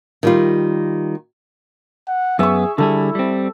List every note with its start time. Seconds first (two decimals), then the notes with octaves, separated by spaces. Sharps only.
0.23 D#3 G3 F4
2.08 F#5
2.39 F#2 B3 G#4 E5 C#6
2.78 D3 G3 E4 G#4 A4
3.15 G3 C4